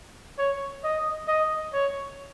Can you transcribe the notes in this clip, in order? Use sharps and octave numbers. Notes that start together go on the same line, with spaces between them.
C#5
D#5
D#5
C#5